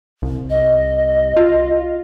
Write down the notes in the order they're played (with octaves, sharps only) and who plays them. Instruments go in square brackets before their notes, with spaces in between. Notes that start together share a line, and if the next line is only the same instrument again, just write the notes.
[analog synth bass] C2
[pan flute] D#5
[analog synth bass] F4